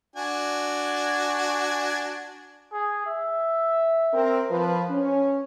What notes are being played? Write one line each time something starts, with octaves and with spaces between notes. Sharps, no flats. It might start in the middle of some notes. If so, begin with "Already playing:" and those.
D4 F#4 G#5
G#4
E5
C4 A#4
F3 B4
C#4